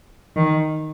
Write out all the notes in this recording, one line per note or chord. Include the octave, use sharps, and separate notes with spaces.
D#3